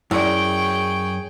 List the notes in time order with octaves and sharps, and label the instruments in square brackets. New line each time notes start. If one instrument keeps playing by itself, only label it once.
[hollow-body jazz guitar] F#2 [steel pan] E4 D5 [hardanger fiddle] G#4 G5 [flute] C#6